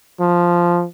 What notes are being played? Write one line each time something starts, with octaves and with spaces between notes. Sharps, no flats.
F3